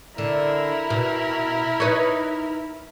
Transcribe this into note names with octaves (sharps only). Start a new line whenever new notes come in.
D3 E4 A#4
B2
D#4 B4 C#5